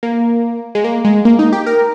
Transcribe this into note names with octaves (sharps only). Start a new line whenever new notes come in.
A#3
G#3
A#3
G#3
A#3
D#4
G4
A#4